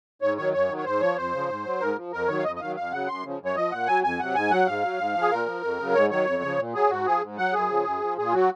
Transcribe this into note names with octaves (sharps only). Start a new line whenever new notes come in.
G#2 C#5
D#3 F#3 C#5
F#2 C#5
D#3 F#3
C#5
G#2 C5
F3 C#5
F2 C5
C#3 F3
G#2
F#3
G#2 A#4
F3
F2 A#4
D#3 F#3 C#5
F5
F2 D#5
D#5
D#3 F#3 F5
F2 F5
C#3 F#3 F#5
F#2 C6
C#3 F3
F#2 C#5
F3 D#5
A#2 F#5
F#3 G#5
F2 G#5
C3 F#3 F#5
G#2 G#5
F#3 F#5
G#2 F5
F#3
G#2
F3
G#4
A#2 A#4
F3
F2
C#3 F#3
G#2 C#5
D#3 F#3 C#5
F2
C#3 F3
A#2
F#3 G#4
G#2 F#4
F3 G#4
G#2
F#3 F#5
F#2 G#4
C#3 F3
F#2
F3
A#2 G#4
F4
F#3 F#4